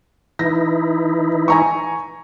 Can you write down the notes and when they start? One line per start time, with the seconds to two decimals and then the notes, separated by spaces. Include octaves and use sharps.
0.39 E3 D#4 E4 A#6
1.48 G#5 A#5 C#6